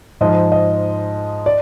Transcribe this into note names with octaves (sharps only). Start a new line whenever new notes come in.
G#2 F3 D#5
D#5
D5